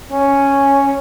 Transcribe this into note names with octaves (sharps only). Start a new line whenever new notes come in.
C#4